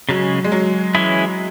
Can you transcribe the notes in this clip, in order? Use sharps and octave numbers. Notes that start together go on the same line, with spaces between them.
C#3 F#3 G#3 C#4
G#3
F#3
E3 G#3 C#4 E4 G#4